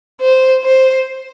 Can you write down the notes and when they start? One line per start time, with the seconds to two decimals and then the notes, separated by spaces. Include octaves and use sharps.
0.21 C5
0.64 C5